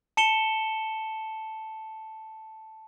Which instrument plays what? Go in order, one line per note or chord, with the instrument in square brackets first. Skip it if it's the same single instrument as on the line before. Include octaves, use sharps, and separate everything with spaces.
[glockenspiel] A5 C#7 E7 G7